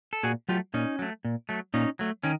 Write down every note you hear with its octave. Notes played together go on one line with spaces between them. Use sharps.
A4
A#2 F#4 G#4
F#3 A3 F4 G4
A#2 C#4 D#4
F#3 A3
A#2
F#3 A3
A#2 C#4 D#4
F#3 A3
D#3 C#4